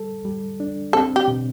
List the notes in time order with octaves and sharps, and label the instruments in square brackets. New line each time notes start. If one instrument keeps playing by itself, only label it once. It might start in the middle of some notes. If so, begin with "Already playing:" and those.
Already playing: [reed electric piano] G3 A4
G3
D4
[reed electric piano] C4 [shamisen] A4
[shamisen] G4
[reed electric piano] B2